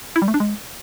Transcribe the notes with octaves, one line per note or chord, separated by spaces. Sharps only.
E4
G3
A3
D4
G#3